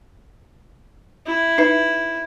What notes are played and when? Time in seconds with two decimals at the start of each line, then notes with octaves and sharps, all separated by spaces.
1.27 E4
1.58 D#4 B4 E5